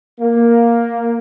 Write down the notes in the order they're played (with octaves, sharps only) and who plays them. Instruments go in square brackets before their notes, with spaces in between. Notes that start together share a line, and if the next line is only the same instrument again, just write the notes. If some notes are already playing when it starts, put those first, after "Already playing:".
[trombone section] A#3